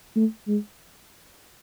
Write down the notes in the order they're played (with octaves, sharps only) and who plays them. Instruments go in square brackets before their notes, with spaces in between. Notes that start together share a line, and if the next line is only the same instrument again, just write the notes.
[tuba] A3
G#3